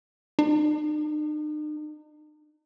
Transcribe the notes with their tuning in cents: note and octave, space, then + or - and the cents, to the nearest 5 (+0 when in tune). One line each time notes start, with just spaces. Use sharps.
D#4 -45